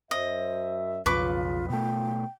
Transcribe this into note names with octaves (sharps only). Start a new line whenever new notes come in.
F#2 C5 D#5 E5
B1 F2 C#3 F4 B4 C#6 D6
F#1 B2 A3 F4 G5